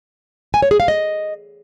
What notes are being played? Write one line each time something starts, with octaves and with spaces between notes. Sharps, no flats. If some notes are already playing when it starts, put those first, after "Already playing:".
G#5
C#5
G#4
F5
D#5